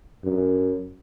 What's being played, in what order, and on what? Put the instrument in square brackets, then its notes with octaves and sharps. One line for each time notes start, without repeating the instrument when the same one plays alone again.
[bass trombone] F#2